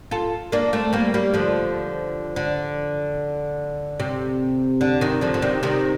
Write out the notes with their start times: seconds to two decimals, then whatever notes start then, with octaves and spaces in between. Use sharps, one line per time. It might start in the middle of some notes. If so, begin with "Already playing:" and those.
0.11 F4 A4
0.52 A#3 D4
0.73 A3 C4
0.93 G3 A#3
1.14 G3 A#3
1.34 D3 F3
2.36 D3
4.00 C3
4.81 D3
5.01 C3 D#3
5.21 D3 F3
5.34 D3
5.42 C3 D#3
5.63 C3 D#3